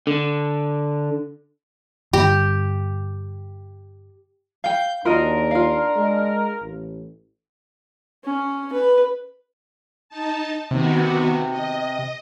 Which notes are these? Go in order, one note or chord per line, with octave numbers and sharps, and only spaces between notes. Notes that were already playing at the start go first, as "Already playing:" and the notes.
D3
G2 D3 G4
F5 G5 G6
D#2 D4 F4 F#4 A#4 D#5
F4 F5
G#3
A1
C#4
B4
D#4 A5
C3 D#3 B3 F#4
D#5